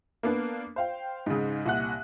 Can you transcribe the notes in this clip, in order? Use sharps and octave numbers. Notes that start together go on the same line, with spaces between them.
A#3 B3 D4
C5 F5 G5
G#2 C#3
C2 A#2 F#5 F#6